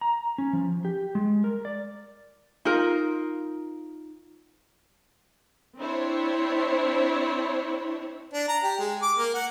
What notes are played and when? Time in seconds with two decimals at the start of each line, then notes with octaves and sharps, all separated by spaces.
0.01 A#5
0.38 C#4
0.53 F3
0.85 G4
1.15 G#3
1.44 A#4
1.65 D5
2.65 D#4 F4 A#4
5.78 C4 D4 E4 C5 C#5
8.33 D4
8.49 A#5
8.63 G4
8.79 G#3
9.03 D6
9.18 A#3
9.34 F#5